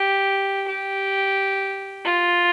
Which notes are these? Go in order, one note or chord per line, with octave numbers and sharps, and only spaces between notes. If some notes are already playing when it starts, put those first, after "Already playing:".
Already playing: G4
G4
F4